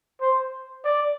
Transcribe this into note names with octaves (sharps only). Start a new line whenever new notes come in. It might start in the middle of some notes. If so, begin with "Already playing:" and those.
C5
D5